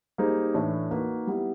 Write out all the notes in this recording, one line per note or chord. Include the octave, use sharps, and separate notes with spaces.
G3 A#3 D#4 G#4 C5
A2 E3 A3 D4
A#3 D#4 F#4 B4
G3 B3 E4